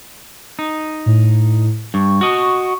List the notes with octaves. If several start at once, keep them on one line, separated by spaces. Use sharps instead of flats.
D#4
A2
G2 C#6
F#4 D#5